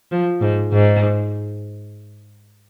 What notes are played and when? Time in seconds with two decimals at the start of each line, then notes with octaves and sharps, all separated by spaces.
0.11 F3
0.41 G#2
0.72 G#2